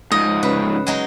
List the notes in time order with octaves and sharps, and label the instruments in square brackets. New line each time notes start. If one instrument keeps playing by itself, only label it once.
[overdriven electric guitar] G#2 F3 [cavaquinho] D#5
[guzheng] C#3 B4
F#3 G#3 D#4